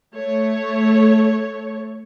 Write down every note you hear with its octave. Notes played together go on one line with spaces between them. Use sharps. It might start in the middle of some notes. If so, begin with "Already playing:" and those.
A3 A4 C#5